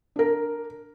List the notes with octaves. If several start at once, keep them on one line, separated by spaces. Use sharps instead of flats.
D4 A#4